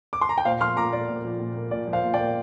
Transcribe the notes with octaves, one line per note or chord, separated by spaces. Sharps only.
D6
C6
A#5
G5
A#2 C5 F5
F3 C6 F6
A#2 A#5 D6
A#3 D5
A#2
F3
A#2
A#3
A#2 D5
F3
C5 F5
A#2
D5 G5
A#3